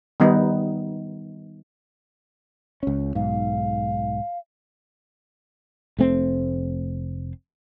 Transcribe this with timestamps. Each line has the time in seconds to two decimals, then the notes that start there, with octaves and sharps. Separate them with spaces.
0.20 D#3 G3 B3 D#4
2.83 C#2 C#4
3.15 B1 G#2 F5
5.98 F1 A3 C4